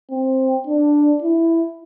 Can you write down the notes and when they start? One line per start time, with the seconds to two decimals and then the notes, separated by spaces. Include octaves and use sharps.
0.10 C4
0.67 D4
1.22 E4